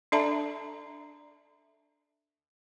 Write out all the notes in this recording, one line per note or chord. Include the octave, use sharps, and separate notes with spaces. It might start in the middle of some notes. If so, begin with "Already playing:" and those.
D4 A4 D5 E5 A5 A#5